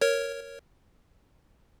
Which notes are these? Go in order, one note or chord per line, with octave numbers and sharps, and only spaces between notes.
A#4 C#5